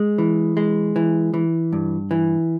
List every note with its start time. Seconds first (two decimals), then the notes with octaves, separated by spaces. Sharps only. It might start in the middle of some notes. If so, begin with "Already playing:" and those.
Already playing: G#3
0.18 E3
0.57 G#3
0.96 E3
1.34 E3
1.73 G2
2.11 E3